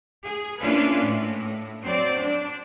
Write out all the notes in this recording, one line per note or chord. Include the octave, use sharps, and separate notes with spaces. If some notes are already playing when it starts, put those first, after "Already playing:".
G#4
A#3 C#4 D4 E4 F4 B4
A2
F#3 C4 D5
D4